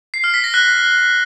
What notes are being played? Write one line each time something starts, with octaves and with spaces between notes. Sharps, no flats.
C7
F6
B6
A#6
F#6